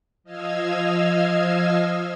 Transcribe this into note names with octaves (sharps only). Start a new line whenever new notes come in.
F3 D#5 F5 E6 F6 G#6